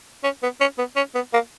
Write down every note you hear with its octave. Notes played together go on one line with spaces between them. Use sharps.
C#4
B3
C#4
B3
C#4
B3
A#3